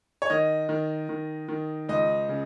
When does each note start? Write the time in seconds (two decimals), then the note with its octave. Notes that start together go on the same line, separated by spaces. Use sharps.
0.22 C#5
0.30 D#3 D#5
0.69 D#3
1.09 D#3
1.48 D#3
1.89 C#2 D#5
2.29 C#3